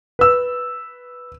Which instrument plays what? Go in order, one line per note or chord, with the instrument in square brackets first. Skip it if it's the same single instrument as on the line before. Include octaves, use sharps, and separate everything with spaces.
[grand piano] B4 E6